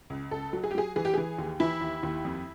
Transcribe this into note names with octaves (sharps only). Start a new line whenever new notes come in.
C#2
C#2 A4
F#3
G#4
G4
F#3 G#4
E3 G#4
G4
E3 G#4
D#2
E3 E4
D#2
D#2
F2